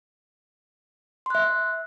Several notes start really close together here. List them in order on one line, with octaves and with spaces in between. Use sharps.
C6 F#6 E5